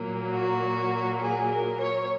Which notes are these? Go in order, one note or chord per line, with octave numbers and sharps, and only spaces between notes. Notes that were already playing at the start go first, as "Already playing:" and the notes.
Already playing: A#2 F#3 A#3
F#4
G#4
A#4
C#5